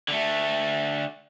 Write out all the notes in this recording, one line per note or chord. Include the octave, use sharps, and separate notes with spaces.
D3 A3